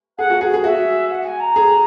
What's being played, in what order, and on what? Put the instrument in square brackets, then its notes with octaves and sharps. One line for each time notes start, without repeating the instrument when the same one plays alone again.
[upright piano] G#4 [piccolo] F#5
[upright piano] F#4
G#4
G#4
[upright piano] F#4 [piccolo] E5
[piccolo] F#5
G#5
A#5
[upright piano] G#4